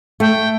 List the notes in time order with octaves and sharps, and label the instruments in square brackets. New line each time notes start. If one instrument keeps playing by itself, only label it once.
[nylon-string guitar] A3 [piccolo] G5